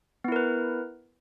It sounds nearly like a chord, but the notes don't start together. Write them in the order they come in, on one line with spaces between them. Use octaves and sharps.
B3 E4 A#4 B4